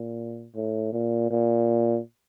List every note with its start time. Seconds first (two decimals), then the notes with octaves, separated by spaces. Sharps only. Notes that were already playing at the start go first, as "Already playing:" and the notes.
Already playing: A#2
0.55 A2
0.93 A#2
1.30 A#2